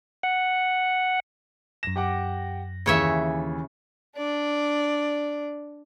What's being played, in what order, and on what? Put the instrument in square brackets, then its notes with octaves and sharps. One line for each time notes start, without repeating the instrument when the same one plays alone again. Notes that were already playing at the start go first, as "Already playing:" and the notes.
[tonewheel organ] F#5
[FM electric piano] F#2 A#6 [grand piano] E7
[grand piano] G4 F#5 D6
[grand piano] D#2 E3 [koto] C#3 C#5 E5
[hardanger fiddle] D4 D5